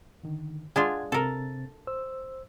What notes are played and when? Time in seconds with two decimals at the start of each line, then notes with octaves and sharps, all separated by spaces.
0.24 D3 D#3
0.76 G#3 D4 F4 F#5 G#6
1.12 C3 C4 A4 A#4 A6
1.87 C5 E6